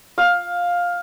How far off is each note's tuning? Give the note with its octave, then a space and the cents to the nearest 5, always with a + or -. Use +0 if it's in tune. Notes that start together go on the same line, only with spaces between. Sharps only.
F5 +10